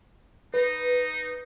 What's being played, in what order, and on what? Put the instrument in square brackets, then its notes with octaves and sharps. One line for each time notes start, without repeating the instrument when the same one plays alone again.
[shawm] D#4 [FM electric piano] B4